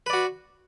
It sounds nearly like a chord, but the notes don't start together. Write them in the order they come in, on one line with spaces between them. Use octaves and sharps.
B4 D5 F#4